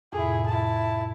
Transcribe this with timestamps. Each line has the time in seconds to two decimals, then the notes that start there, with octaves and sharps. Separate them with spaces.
0.13 F2 A2 C3 E4 G#4
0.46 E4 A5